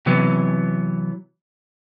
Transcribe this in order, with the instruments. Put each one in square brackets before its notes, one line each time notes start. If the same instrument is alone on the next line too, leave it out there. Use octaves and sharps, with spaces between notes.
[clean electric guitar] C3 E3 F#3 B3